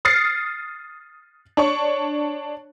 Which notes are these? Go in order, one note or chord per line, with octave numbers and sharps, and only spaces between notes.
D#6 F6 A6 C7 C#7
D4 C#5 C#6